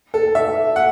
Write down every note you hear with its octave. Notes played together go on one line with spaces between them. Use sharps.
A4
E5
F#5